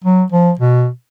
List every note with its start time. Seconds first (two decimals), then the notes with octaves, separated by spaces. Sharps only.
0.04 F#3
0.32 F3
0.59 B2